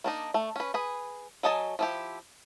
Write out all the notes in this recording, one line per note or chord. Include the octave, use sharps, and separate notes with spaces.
A#3 D4 D#4
A3
C#4 B4
G#4 B4
F#3 A4 D#5 G#5 A5
F3 E4 G4